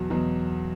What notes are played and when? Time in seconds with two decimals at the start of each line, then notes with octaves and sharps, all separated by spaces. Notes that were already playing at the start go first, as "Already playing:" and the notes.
Already playing: E2 B2 F#3
0.10 E2 B2 F#3